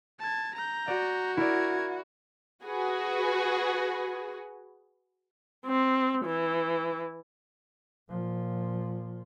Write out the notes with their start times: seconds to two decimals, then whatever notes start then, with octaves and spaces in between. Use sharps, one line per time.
0.19 A5 G#6
0.55 A#5 G6
0.88 F#4 D5
1.37 E4 A#4 D5 G#6
2.64 F#4 G#4 B4
5.66 C4
6.26 E3
8.09 A#2 F3